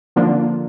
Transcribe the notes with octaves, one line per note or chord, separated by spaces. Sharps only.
D3 F3 A#3 D4 F4